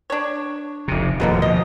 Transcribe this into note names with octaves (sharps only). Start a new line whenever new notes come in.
D4 C#5
F1 C3
D1 D#2 B2 D3 F3 A#3
B2 F3 D#5